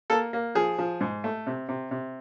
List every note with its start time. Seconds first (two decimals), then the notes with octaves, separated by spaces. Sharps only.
0.10 A#3 A4
0.33 A#3
0.55 F3 G#4
0.78 F3
1.01 G#2
1.24 A3
1.47 C3
1.69 C3
1.91 C3